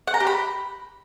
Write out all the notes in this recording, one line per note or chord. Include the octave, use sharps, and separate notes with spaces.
F#5
A#5
G4
B5